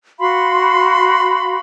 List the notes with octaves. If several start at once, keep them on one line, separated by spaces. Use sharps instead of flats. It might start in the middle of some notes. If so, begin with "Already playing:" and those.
F#4 F5 B5 C6